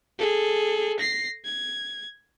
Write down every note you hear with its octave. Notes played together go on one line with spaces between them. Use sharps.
G#4 A4
A#6 C7
G#6